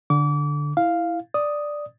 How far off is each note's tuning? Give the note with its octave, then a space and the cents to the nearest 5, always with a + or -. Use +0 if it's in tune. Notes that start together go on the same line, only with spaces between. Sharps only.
D3 +0 D6 -35
E4 +0 F5 +0
D5 +5 D#6 +0